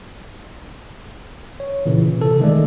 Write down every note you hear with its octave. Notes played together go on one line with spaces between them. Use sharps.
C#5
A#2 C#3 E3
C3 A4
D#3 G#3 A3 D5